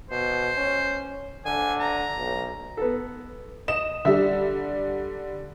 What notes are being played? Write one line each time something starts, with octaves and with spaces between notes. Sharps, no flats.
B2 C5
C#4
D3 G#5
A#5
B1
B3 A4
D#5 E7
D3 G3 E5